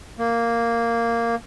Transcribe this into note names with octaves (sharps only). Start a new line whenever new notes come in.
A#3